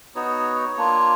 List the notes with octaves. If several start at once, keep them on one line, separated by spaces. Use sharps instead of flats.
B3 D#4 F#4 C#5
A#3 D4 F4